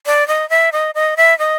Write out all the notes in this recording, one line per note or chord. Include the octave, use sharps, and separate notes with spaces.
D5
D#5
E5
D#5
D#5
E5
D#5